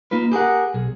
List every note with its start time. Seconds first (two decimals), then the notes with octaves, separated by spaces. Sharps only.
0.11 A#3 D#4 F4 B4
0.32 G4 G#4 A#4 F#5
0.74 B1 G#4